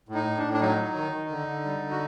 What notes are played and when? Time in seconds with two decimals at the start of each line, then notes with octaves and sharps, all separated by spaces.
0.09 A2
0.15 D#4
0.26 A2
0.38 D4
0.44 A2
0.53 D4
0.61 F#3 D#4
0.78 F#3
0.95 D#3
1.12 D#3
1.30 D3
1.48 D3
1.64 G3
1.81 D3
1.91 F#4